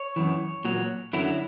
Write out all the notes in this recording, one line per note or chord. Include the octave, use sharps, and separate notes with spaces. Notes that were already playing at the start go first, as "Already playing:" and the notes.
Already playing: C#5
F#2 E3
A#2 F#3
F#2 D3 F#3 E4